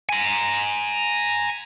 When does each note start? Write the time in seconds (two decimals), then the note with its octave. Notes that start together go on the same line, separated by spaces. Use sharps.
0.09 G#5 A#5